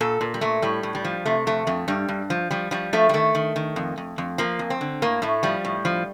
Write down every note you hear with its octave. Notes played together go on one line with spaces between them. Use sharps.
A#2 A4
A#2
G3
A#2 A3
A2 G3
A2
G3
F3
C3 A3
F2 A3
F2 A3
G2 G3
G2
F3
F3 G3
F3 G3
F3 A3
G3
D#3 A3
D#3
D#3
F2
F2
F2
F3 A#3
F2
C4
D3
A2 A#3
A2 A3
F3 G3
A2
F3